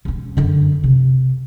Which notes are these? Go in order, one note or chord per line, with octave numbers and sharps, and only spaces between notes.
E1 C#4
F#2 D3
C3